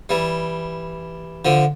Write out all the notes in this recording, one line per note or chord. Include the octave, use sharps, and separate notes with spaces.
E3 G3
D3 F3